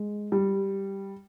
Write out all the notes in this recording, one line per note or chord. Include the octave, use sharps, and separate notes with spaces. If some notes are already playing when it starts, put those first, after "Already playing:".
Already playing: G#3
G3